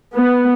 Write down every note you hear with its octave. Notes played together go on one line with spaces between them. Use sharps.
B3